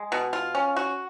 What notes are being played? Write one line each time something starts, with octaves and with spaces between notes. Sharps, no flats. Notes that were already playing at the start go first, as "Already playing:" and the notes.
Already playing: G#3
B2
F4
C#4
F#4